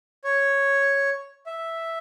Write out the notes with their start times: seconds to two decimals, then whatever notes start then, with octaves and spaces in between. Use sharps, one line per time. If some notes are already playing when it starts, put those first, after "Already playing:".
0.24 C#5
1.46 E5